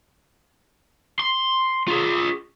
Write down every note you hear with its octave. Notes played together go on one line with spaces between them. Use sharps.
C6
F4 G#4